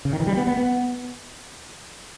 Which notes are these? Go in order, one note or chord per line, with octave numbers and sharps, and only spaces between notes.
C#3
D#3
E3
G3
B3
B3
B3